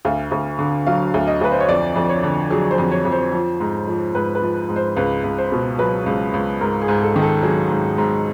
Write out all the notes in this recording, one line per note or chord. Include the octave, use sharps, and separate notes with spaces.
D2 F5
D2
D3
F#3 F5
D2
D#5
D2 B4
C5
C#5
F2 D5
F2
C#5
D3
F#3 G#4
C5
F2
C#5
F2
C5
F3
G#2
F3
G#2 B4
B4
F3
G#2
C5
C#2 B4
C#2
C5
B2
F#3 B4
C#2
C#2
G#2 A#4
G#4
G#2
A4
D#3
A4
F#3 G#4
G#2
G#2